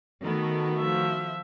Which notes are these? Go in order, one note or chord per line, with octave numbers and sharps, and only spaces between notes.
D#3 A3 B3 F#4
F3 E5